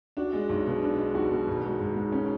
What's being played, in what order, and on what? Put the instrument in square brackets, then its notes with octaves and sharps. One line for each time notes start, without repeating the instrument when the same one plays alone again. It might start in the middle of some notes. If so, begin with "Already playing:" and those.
[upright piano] D4 [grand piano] F#4
[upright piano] G#3
B1
B2
D4
G#3
[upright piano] B1 [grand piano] F#4
[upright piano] B2
G#1
G#3
G#1
G#2
[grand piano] C#4